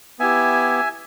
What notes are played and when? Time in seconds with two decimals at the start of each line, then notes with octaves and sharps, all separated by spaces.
0.19 B3 E4 G4 E5 G#5